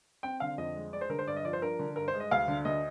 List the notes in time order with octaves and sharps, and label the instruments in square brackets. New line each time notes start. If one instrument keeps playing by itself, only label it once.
[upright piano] C4 G5
D3 F5
F2 D#5
G#3
G#3 D5
C5
D3 A#4
C5
G2 D5
D#5
F3 D5
C5
D4 A#4
D3
G2 A#4
C5
G#3
D#5
D2 F5
D3
D2 D#5